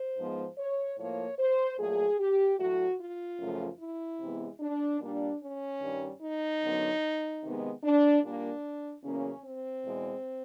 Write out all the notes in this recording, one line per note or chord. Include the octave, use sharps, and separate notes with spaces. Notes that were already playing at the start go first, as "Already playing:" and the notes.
Already playing: C5
G#2 F3 G#3 B3
C#5
A2 F3 A#3 C#5
C5
A#2 F#3 A3 G#4
G4
A2 F#3 A3 F#4
F4
F#2 C#3 F3 A3
E4
C3 E3 G#3 B3
D4
A#2 G3 A#3 D4
C#4
G2 D#3 G3
D#4
F#2 D3 F#3 B3
C3 D#3 G#3 B3
D4
A#2 G3 A#3 D4
E2 C#3 F#3 A#3 C#4
C4
E2 B2 G#3